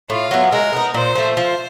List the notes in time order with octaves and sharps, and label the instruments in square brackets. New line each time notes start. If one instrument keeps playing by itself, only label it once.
[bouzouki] A2 [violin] F4
[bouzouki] F#3 B3 E4
[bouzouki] G#3 [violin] A#4
[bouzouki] B3 D#4
[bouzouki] A#2 [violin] C5
[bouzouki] F3 A3
[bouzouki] F3 [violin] C5